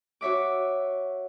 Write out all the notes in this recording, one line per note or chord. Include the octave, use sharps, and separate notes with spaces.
F#4 C#5 E5 D6